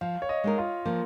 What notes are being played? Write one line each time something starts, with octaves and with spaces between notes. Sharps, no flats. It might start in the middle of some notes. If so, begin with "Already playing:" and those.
F3 F5
C#5
D#5
G#3 D#4 A#4
F4
F3 A#3